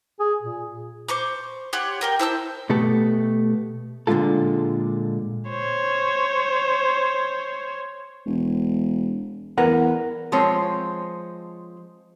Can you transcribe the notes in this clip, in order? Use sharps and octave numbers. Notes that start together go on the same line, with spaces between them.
G#4
A#2
C5 C#6 D6
G4 C#5 F#5 C6
G4 A#4 G5
E4 C5 A5 E6
B2 A3 B3 G4 A4
A#2 D3 F#3 G#3 F4 A4
C5 C#5
E1
E2 A#4 B4 F#5
F3 G#3 C4 C#5